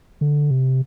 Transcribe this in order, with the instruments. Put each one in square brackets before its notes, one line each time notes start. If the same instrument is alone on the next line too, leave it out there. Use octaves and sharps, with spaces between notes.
[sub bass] D3
C3